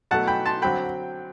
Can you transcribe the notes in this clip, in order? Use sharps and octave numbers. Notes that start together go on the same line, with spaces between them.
B2 F#3 A3 F#5 A5
G5 B5
A5 C6
D3 F#3 C4 G5 B5